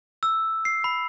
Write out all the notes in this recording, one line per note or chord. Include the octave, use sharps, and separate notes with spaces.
E6
C7
B5